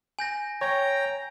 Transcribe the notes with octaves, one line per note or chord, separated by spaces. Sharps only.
G#5 G6 A#6
C#5 G5 A#5